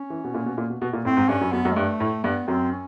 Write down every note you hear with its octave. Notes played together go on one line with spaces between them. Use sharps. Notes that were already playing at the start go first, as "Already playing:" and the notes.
Already playing: C#4
E3
B2
A#2
B2
A#2
B2
B2
A#2
A2 C4
G#2
G2 C#4
F#2
F#2 B3
F#2
G#3
G2 A3
A2
G2 B3
F#2 C4
C#4